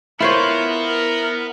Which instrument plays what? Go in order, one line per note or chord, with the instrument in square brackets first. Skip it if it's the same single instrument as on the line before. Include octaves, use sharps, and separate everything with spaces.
[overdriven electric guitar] B3 [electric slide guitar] E4 [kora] F4 C5 C#5 [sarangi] A#4
[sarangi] A#4